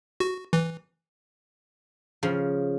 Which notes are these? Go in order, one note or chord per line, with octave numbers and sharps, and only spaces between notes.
F#4
E3
C#3 F3